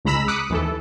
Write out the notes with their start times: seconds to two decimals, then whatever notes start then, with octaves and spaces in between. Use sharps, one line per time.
0.05 C#2 G#3 A#5 B5 E6 B6
0.28 D6 D#6 F#6 B6 C#7
0.50 D#2 E3 A4